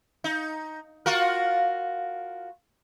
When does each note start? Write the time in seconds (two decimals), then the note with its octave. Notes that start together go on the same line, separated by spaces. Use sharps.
0.24 D#4
1.06 F4 F#4 A#4